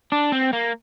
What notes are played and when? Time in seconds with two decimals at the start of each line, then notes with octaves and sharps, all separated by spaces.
0.12 D4
0.32 C4
0.53 A#3